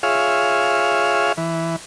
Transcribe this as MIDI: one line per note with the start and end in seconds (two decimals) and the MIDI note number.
0.03 1.32 65
0.03 1.32 68
0.03 1.32 73
0.03 1.32 76
0.03 1.32 77
1.37 1.76 52